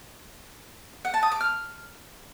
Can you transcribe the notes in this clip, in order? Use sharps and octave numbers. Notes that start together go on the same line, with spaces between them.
F#5
A5
D#6
D6
F6